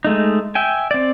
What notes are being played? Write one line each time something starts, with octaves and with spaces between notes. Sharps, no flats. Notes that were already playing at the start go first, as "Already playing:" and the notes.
G#3 A3 D#4
E5 G5 G#5
C4 D5